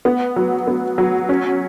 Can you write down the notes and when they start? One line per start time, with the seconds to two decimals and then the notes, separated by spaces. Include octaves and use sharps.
0.05 B3
0.36 F#3
0.67 B3
0.98 F#3
1.29 C#4